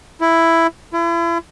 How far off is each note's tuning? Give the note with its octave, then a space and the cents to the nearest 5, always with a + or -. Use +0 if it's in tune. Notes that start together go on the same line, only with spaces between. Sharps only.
E4 +5
E4 +40